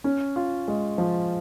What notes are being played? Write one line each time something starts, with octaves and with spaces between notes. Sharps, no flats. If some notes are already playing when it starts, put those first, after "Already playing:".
C#4
F4
G#3
F3